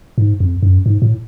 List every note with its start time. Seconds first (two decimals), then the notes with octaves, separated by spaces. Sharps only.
0.18 G#2
0.40 F2
0.63 F#2
0.86 G#2
1.02 A2